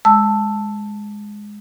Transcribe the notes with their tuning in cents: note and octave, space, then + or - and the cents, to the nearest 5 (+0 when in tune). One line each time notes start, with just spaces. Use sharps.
G#3 +0 A5 +5 E6 +0